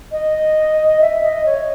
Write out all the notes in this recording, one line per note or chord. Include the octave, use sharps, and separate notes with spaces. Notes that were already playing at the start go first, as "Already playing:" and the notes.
D#5
E5
D#5
C#5